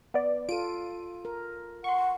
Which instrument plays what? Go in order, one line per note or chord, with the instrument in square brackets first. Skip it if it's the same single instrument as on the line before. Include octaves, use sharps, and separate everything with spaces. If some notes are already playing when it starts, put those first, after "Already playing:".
[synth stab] B3 D5
[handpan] F4 A4 [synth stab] D7 D#7
[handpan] A#4
[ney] F#5 [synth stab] C6 C#6